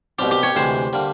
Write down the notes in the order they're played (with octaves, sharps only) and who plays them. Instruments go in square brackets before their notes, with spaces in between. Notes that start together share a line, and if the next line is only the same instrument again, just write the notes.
[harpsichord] C2 B2 G3 C4 [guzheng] G4
[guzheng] G4
C#5
[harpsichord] D2 C3 E3 G#3 [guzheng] C5
[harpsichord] D3 G3 A#3